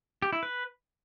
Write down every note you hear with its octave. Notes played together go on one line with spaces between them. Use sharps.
G4
E4
B4